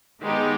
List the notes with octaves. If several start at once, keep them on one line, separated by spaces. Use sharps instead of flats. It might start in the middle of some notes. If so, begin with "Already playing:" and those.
D#3 G#3 B3 D#4 G4